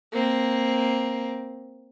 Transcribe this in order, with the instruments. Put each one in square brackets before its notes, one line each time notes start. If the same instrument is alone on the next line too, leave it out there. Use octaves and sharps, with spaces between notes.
[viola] A#3 C4